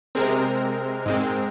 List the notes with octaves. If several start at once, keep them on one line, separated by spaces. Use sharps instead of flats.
C3 G#3 C4 A#4
G#2 G#3 C4